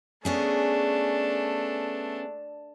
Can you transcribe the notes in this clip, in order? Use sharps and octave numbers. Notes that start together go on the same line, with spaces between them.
A3 B3 C#4 D4 G#4